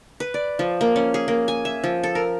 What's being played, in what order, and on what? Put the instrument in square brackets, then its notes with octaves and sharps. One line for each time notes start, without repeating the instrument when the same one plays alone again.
[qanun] B4
D5
F3
A#3
C#4
G#4
A#3
G#5
E5
F3
A4
A#4